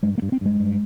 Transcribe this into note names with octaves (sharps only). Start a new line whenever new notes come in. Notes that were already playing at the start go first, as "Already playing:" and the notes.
G2 G#3
A#3
G2
C4
G2 G#3
G2